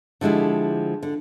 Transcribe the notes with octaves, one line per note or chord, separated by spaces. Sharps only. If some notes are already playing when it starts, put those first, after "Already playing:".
D3 F3 G#3 E4 G4
D3